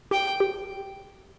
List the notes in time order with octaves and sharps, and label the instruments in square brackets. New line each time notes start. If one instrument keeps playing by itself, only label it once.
[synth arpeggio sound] G4 [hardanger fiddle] G5
[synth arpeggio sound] G4